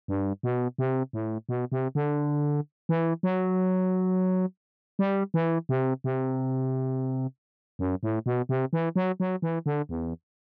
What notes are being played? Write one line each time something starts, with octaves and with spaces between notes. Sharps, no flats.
G2
B2
C3
A2
B2
C3
D3
E3
F#3
G3
E3
C3
C3
F#2
A2
B2
C3
E3
F#3
F#3
E3
D3
E2